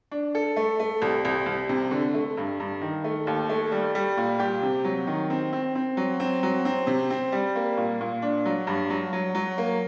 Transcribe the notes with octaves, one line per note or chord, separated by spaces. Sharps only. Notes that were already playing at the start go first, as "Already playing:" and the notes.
D4
A4
A3
A3
C2
C2
C2
C3
D3
A3
G2
G2
D#3
A3
D#2
A3
G3
G3
A#2
G4
C3
F#3
D#3
C4
C4
C4
F#3
C4
F#3
C4
C3
C4
G3
A#3
A#2
A#2
D4
F#3
G2
F#3
F#3
F#3
A#3